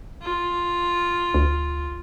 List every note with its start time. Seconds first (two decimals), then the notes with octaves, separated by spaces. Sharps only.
0.22 F4
1.34 D2